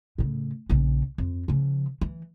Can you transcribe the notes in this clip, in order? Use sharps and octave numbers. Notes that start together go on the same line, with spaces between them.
A2 C#3
A#1 C#3
F2
C#3 F3
E3